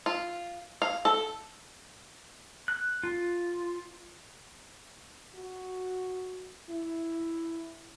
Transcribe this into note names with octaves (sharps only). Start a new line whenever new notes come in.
F4
F5
A4
F#6
F4
F#4
E4